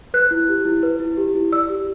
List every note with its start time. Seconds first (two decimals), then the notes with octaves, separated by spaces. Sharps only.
0.14 B4 F#6
0.31 E4
0.49 G4
0.65 E4
0.83 B4
1.00 E4
1.17 G4
1.35 E4
1.52 D5 E6
1.70 G4